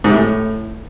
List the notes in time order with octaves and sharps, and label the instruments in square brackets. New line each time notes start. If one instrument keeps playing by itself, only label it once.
[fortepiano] G#2
C3
A2